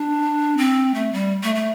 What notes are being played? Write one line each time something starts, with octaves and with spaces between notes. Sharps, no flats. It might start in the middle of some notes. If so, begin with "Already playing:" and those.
Already playing: D4
C4
A3
G3
A3
A3